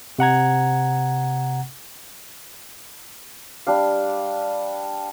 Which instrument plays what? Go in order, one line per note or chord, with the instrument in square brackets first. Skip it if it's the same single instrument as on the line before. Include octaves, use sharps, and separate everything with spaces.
[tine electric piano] C3 F#5 A#5 G#6
[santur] G3 D4 F5